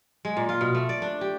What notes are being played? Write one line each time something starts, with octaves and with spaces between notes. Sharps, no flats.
G#3
A#2
F4
B2
A3
D5
D4
G4